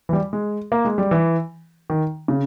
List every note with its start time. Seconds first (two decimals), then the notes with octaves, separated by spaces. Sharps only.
0.09 E3
0.13 G3
0.33 G#3
0.72 A#3
0.85 G#3
0.98 G3
1.11 E3
1.90 D#3
2.28 C#3